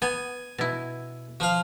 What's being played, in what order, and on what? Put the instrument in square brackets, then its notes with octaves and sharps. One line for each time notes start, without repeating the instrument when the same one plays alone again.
[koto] B3 [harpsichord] G#5
[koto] B2 E4
[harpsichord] F3 F5